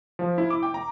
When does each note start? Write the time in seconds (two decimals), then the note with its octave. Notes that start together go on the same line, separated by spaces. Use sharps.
0.19 F3
0.38 E4
0.50 D6
0.63 G5
0.74 A#5